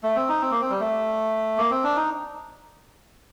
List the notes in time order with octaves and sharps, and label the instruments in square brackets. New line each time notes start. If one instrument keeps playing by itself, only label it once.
[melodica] A3
C4
D#4
C4
A#3
C4
G3
A3
A#3
C4
D4
D#4